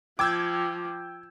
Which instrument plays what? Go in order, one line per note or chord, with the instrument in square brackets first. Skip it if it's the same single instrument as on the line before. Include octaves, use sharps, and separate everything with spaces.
[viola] F3 [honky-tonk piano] G5 G#6 [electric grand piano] D6 E6 G6